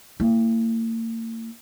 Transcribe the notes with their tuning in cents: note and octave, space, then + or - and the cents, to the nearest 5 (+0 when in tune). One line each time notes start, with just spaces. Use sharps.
A#3 -40 E4 +20